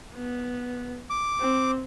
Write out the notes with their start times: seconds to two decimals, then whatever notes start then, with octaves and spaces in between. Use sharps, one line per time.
0.15 B3
1.10 D6
1.40 C4